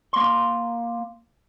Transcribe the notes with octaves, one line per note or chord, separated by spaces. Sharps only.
A#3 C6